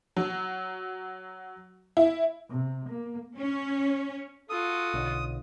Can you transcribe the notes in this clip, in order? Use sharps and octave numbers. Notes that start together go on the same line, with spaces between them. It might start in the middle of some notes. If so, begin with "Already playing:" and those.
F#3
E4
C3
A#3
C#4
F4 F#4 A4 D#6
B1 D3